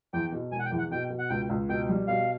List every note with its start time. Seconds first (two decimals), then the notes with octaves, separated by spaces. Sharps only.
0.13 E2 G5
0.32 B2
0.51 E1 G#5
0.59 F#5
0.66 G5
0.71 E2
0.78 F#5
0.91 B2 G5
1.10 B2
1.19 F#5
1.29 C#2 G5
1.49 C#2
1.69 B2 G5
1.89 G3
2.07 B2 F5